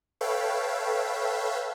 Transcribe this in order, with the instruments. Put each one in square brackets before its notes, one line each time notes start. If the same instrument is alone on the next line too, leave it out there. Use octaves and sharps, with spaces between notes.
[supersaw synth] A4 B4 C#5 E5 F5 G5